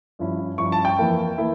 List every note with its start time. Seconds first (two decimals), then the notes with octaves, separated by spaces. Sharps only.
0.19 G2 F3 C#4 E4
0.58 G2 F3 C#4 E4 C#6
0.72 A5
0.85 G5
0.98 F2 E3 A#3 E4
1.38 E3 A#3 E4